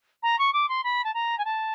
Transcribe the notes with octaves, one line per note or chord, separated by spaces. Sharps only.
A#5
C#6
D6
C6
B5
A5
A#5
G#5
A5